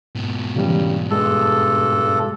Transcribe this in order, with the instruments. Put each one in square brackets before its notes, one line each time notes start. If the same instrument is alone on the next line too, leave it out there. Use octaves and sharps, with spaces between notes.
[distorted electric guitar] G#2 B2
[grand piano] C#3 E3 G3
[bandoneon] G2 A4 [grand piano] G#3